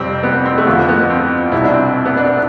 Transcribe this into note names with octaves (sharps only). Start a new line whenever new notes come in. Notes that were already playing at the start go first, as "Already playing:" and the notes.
Already playing: F2 C3 G3 C4
B3
C4
A3
F2 D3 F3 B3
B3
C4
C2 B2 G3 E4
D4
C4
B3
D4
D4